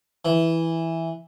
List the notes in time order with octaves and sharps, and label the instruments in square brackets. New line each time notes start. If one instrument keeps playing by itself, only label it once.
[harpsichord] E3